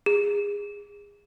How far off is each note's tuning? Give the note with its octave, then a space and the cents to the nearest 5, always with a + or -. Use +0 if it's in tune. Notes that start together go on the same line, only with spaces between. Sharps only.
G#4 -25